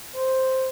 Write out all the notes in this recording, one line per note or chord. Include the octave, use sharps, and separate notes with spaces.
C5